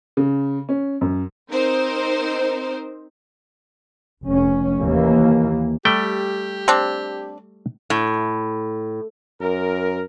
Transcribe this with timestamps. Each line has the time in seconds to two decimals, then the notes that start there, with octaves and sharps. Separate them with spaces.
0.17 C#3
0.69 C#4
1.01 F#2
1.51 C4 D#4 A#4 C5
4.24 F1 C#4
4.80 D#2 E3 A#3
5.85 G3 A3 G4 G5
6.68 C4 D4
7.90 A2
9.41 F#2 A#4